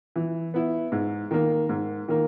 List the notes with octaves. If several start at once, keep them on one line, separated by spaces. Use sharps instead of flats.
E3
B3 E4
G#2
D#3 A#3
G#2
D#3 A#3